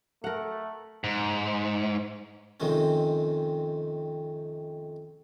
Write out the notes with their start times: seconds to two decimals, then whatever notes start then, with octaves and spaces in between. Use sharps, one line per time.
0.24 A3 A#4 F#5
1.04 G#2
2.60 F2 C3 D#3 G#3 C4 C#4